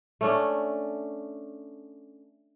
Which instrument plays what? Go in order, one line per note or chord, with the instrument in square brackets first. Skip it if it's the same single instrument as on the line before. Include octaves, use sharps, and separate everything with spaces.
[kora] A3 C#4 D4